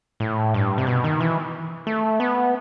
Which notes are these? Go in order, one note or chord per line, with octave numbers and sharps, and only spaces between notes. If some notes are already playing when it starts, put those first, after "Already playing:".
A2
G2
C3
B2
D#3
E3
A3
B3